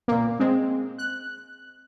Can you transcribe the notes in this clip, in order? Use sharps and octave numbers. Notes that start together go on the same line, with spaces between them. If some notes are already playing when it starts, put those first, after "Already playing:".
A#2 A#3
G#3 C4
F#6